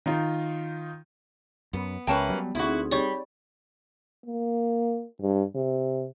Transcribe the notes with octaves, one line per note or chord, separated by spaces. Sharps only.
D#3 D#4 F4
F#2 B3
C#2 A#3 C#4 B4 E5 G5 A5 E7
F#3 G3 B3
D2 C4 D#4 E4 F#4 G#4
G3 C#5 C#6
A#3
G2
C3